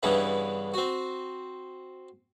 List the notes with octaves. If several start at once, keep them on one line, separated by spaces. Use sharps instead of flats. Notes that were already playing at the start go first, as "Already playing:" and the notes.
G2 C#3 E3 G3 B3 D4
C4 F#4